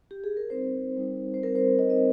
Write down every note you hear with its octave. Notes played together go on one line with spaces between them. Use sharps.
G4
G#4
A#4
G3 C4 D#4 C5
G3 C4 D#4
C5
G3 C4 D#4 A#4
C5
D#5
G3 C4 D#4 D#5